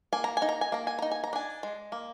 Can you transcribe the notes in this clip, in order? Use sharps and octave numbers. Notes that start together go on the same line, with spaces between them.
A#3 G#5
A#5
G#5
D#4
A#5
G#5
A#3 A#5
G#5
D#4 A#5
G#5
A#5
D4 G#5
G#3
A#3